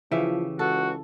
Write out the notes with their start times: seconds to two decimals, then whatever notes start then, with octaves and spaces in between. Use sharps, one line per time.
0.12 C#3 E3 F3 G4 E5
0.59 C#2 F#4 A4